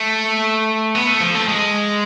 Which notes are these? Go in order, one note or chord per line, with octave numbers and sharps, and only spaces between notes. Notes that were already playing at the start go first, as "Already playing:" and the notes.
Already playing: A3
B3
A3
F3
A3
G#3